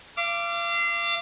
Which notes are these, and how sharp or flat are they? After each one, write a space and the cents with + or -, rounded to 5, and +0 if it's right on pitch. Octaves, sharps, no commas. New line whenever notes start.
F5 -35 D6 +0